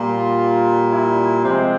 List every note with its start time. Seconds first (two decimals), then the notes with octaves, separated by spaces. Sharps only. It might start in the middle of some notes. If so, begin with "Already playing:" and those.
Already playing: A#2 G3 F4
0.90 E4
1.44 C3 F3 G#3 C4